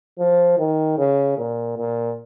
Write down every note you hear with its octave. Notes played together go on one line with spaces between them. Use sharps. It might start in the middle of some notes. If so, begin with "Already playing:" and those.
F3
D#3
C#3
A#2
A#2